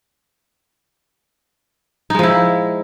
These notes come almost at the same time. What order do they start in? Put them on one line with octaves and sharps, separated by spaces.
D#4 G#3 F3 E4